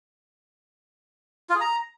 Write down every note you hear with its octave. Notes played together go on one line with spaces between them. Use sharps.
F4
G#4
A#5